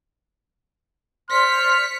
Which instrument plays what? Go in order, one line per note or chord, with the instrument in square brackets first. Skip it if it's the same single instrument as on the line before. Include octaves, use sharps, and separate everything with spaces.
[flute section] C5 D5 C6 [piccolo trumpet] F6 [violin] B6 C#7